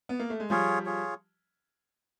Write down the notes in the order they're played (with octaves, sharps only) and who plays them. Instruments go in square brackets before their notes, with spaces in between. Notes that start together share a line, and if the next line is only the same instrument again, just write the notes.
[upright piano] B3
A#3
A3
G#3
[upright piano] F3 G3 [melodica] F4 G#4 C#5
[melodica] F4 G#4 C#5